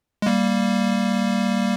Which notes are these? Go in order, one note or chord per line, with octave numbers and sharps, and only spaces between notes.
G#3
G3 A#3